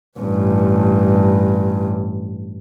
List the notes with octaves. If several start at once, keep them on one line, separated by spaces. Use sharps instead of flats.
A1 G2